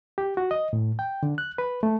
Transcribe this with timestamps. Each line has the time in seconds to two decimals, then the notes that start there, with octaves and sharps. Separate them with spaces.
0.18 G4
0.37 F#4
0.51 D#5
0.73 A2
0.99 G5
1.23 D3
1.38 F#6
1.58 B4
1.83 A3